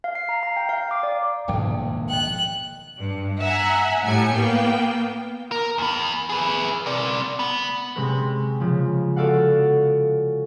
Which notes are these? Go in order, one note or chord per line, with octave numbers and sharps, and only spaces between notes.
F5
C7
A#5
A#5
G5
F5
D6
D5
D#1 A#1 E2 G#2 B2 A4 G5
D#5 G5 F#6
G2
E5 F#5 G#5 A#5
A2 G3 G#5 C#7
A#3 B3 G5
A#4
E2 B3
G#4 B4
C4 D5
B3
C3 G#3 C4 C#4 B4
C#3 F3
B3 F#4 A4 D5 F5 F#5